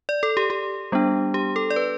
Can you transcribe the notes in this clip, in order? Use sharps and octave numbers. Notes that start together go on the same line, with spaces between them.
D5
A4
G4
G4
G3 B3 D4
G4
A4
D5
B4